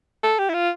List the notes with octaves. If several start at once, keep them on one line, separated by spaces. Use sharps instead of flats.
A4
G4
E4
F4